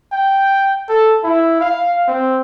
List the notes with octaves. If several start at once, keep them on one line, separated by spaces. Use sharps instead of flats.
G5
A4
E4
F5
C4